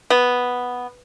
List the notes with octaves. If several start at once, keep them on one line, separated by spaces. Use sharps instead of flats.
B3